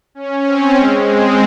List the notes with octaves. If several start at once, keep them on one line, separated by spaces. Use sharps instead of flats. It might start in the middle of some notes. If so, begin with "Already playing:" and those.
C#4
C4
G#3
C4